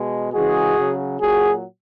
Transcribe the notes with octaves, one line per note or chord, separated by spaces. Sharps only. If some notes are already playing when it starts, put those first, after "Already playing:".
Already playing: B2 G#3
C#3 E3 G#3 F#4 G#4
C#3 F#3
A#2 F#3 F#4 G#4